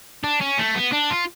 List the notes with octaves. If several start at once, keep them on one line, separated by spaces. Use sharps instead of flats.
D4
C#4
A3
B3
D4
F4